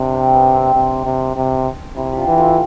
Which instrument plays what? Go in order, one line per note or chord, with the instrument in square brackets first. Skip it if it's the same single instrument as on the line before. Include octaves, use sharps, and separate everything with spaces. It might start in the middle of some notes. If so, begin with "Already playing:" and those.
Already playing: [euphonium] C3 [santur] D4
[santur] C4
B3
C4
[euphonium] C3
C3
C3
[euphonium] C3 [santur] E4
[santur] D4 F4 G4
[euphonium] E3
[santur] F4 A4